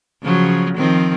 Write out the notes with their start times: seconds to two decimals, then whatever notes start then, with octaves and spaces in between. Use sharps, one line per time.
0.23 C#3 F3 F#3
0.77 D#3 F3 C4